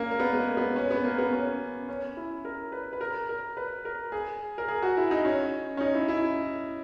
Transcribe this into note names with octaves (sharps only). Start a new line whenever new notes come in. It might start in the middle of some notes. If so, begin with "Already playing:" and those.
Already playing: A#3 C#4
A#3
B3
G#3
A#3
B3
C#4
B3
A#3
B3
C#4
C#4
E4
A#4
B4
B4
A#4
A#4
B4
A#4
G#4
A#4
G#4
F#4
E4
D#4
C#4
C#4
D#4
E4
E4